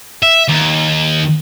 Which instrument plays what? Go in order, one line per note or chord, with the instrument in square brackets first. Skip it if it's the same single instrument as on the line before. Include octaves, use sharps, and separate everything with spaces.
[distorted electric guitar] E5
D#2